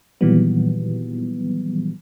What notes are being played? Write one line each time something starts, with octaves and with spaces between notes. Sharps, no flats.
A#2 D#3 E3 F#3 G3 B3